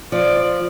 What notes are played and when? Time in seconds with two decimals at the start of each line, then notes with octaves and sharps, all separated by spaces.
0.12 F3 D5